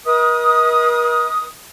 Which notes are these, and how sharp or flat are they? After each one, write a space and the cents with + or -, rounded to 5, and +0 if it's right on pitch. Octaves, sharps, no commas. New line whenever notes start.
A#4 +45 D#5 +40 D#6 +0